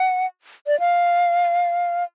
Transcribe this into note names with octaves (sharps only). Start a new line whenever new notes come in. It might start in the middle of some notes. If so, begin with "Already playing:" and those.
Already playing: F#5
D5
F5